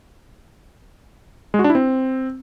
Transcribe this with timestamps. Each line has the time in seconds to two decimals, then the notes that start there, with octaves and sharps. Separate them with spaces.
1.54 G#3
1.59 F#4
1.64 D4
1.70 E4
1.75 C4